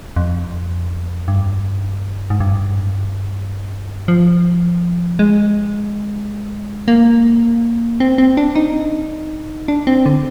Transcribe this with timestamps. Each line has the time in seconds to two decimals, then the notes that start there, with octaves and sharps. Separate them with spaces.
0.16 F2
1.28 G2
2.30 G#2
2.40 G2
4.08 F3
5.19 G#3
6.88 A#3
8.00 C4
8.18 C4
8.37 D4
8.55 D#4
9.68 D4
9.87 C4
10.06 D3